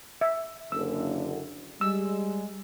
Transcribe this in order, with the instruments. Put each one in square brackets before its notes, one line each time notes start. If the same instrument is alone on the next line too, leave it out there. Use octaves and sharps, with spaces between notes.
[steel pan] E5
[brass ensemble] F#1 D3 [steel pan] E6
[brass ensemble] G3 G#3 [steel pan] E6